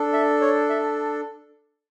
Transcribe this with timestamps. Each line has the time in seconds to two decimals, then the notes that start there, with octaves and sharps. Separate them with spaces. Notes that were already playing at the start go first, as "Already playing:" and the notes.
Already playing: D4 A4
0.13 E5
0.41 C#5
0.70 E5